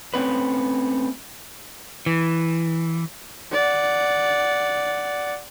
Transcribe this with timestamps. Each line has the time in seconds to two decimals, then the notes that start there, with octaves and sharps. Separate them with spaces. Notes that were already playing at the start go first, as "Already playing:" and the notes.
0.14 A3 C4 C#4 B4
2.06 E3
3.53 D5 F#5